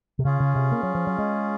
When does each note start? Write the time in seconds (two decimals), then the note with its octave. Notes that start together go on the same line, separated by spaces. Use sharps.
0.19 C3
0.25 C#3 C#4 F4 G#4
0.40 C#3
0.56 C3
0.72 A#3
0.83 F#3
0.95 F3
1.07 F#3
1.19 G#3